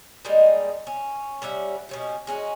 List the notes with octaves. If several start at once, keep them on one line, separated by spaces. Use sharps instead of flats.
G3 G#3 A#3 D#4
C#4
G3 C#4 E5 F#5
B2 C#4 G4
G#3 C#4 F#4